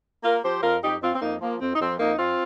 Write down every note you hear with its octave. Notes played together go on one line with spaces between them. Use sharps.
A#3 F4 A#4
F3 G4 C5
F2 F4 A#4
F2 D#4 G4
F2 C4 F4
C4
F2 A#3 D#4
F3 A#3
F2 C4
D#4
F2 C4
F2 A#3 D#4
F2 C4 F4